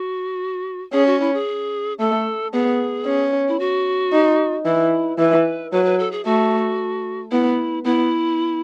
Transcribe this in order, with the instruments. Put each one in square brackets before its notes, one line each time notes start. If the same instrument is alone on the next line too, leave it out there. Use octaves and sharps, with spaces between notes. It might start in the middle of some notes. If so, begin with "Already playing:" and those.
Already playing: [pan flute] F#4
[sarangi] C#4 [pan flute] G#4
[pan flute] F#4
E4
G#4
[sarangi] A3 [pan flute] A4
[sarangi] B3 [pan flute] G#4
[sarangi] C#4
[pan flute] E4
F#4
[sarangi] D#4
[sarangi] E3 [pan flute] E4
[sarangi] E3 [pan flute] B4
[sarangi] F#3 [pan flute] B4
[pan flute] B4
A4
G#4
[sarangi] A3 [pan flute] F#4
[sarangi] B3 [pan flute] E4
[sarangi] B3 [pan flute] E4